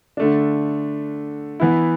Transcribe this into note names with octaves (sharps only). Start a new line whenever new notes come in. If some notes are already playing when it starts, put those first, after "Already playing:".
D3 A3 D4
E3 B3 E4